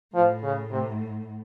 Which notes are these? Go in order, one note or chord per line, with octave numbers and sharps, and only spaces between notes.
A2 F3
C#3
C3